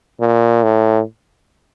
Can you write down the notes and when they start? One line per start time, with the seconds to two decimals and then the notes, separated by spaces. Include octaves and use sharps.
0.20 A#2
0.63 A2